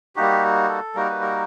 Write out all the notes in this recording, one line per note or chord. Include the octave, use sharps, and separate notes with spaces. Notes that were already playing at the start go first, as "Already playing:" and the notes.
G3 A#3 D#4 F#4 G4
A4
G3 A#3 D#4 F#4 A#4
B4
A#4